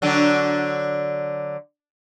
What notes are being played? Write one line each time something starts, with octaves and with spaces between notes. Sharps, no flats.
D3 F#3 D4